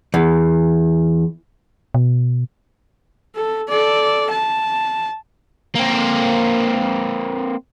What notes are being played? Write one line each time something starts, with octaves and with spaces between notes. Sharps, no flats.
E2
B2
A4
A4 D5
A5
A#3 C4